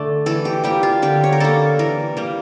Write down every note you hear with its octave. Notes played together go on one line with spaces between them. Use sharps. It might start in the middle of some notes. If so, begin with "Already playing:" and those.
Already playing: D3 A3 D5
E3 A4
G4
G3 A#3 G4
F4
D3 G4
C#5
A#4
G3 A#3 A4
E3 A#4
G3 A#3